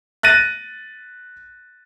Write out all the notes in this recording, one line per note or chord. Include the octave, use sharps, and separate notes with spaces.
F#6 A6 A#6 D#7